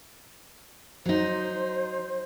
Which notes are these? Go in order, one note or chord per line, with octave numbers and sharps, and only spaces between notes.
F#3 D#4 C5